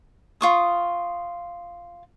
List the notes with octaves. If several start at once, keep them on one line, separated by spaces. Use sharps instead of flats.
F4 C#6 D#6